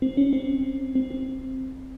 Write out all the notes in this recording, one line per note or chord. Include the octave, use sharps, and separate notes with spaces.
C4
C#4
C4
C4
C4